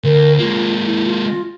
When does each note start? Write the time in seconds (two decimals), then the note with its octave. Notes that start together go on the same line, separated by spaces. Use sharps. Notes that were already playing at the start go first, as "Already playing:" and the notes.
0.04 D2 A#4
0.39 G#3 A#3 F4
0.85 E4
1.06 F4